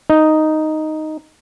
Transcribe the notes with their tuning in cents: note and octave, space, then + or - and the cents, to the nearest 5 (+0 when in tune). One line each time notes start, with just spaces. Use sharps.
D#4 +0